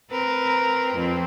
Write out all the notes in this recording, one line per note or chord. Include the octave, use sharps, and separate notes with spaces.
C4 A#4 B4
F2 C4